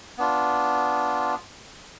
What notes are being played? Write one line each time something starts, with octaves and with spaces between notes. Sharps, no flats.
B3 D4 F4